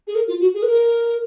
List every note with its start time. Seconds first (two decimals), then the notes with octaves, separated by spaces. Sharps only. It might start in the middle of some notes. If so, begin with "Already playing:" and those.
0.07 G#4
0.15 A#4
0.28 F4
0.41 F#4
0.54 G#4
0.62 B4
0.67 A#4